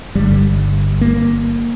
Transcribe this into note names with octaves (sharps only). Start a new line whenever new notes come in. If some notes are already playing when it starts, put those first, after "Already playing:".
G1 G2 D3 G3
A#3